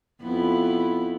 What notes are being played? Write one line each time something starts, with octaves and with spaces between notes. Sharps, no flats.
F2 B3 E4